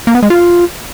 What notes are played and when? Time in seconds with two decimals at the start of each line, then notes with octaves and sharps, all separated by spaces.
0.07 A#3
0.15 B3
0.23 G#3
0.30 F4